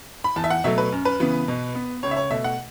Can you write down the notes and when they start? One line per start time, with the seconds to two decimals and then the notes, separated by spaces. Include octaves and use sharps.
0.24 B5
0.36 E2 A5
0.44 E5
0.50 F#5
0.64 B2 F#3 A3 E5
0.78 B4
0.92 F#2
1.05 B4
1.20 C#3 E3 B3
1.48 B2
1.75 B3
2.03 C#2 C#5
2.11 E5
2.17 C#5
2.31 B2 A3 E5
2.44 F#5